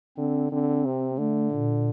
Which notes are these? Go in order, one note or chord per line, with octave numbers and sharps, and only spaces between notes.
D3 C4
D3 C4
C3
D3 A3
A#2